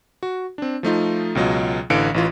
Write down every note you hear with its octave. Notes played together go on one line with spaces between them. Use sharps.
F#4
C4 D4
F3 A3 D#4 F4
C#2 B2 F#3 F4 D#5
A1 D3 E3 F5 C#7 D7
A1 E3 F4